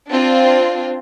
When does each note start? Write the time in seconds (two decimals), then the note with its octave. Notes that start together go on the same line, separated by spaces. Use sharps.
0.11 C4 D4 F4